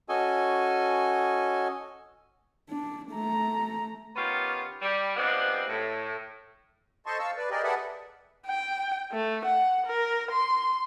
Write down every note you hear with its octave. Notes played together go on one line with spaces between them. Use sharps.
C#4 F#4 A4 D#5 G#5
D4
A3 A#5
D#3 B3 C#4 F4 G4
G3
F3 G3 G#3 B3 C4 D4
A2
A4 C5 D#5 A5 C6 C#6
F5 A5 C#6 E6
B4 D5
G4 G#4 A#4 D5 D#5
G#4 A4 B4 D5 E5 F#5
G5
A3
F#5
A#4
C6